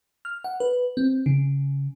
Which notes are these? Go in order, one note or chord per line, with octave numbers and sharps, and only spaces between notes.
F6
F#5
B4
C4
C#3